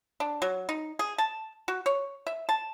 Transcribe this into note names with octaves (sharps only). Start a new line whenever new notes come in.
D4
F#3
D#4
G#4
A5
F#4
C#5
E5
A5